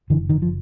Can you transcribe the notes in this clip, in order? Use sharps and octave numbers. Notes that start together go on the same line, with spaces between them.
F#1 D3 E3
D#3
F3